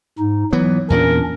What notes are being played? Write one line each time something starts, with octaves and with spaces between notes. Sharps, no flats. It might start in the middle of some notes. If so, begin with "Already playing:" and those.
G#2 D#4
E3 F#3 B3
E2 A#2 C#4 D4 A#4